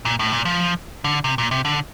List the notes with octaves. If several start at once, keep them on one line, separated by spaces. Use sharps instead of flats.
A#2
A2
A#2
F3
D3
C3
A#2
C3
D3